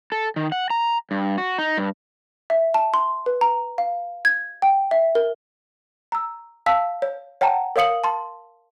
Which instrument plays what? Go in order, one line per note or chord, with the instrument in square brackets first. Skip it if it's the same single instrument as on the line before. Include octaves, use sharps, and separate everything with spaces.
[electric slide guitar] A4
D#3
F#5
A#5
G2
F#4
D#4
G2
[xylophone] E5
A5
C6
B4
A#5
F5
G#6
G5
E5
A#4
A#5 E6
F5 A5 E6 B6
C#5
C#5 F#5 G5 A5 A#5
A#4 C#5 F5 D#6 C#7 F#7
A5 C6